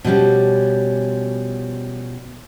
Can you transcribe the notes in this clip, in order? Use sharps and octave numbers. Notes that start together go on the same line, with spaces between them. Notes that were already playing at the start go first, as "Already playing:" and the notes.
B2 F3 G3 C#4